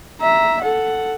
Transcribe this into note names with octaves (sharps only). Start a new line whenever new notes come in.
E5 A#5
A4 F#5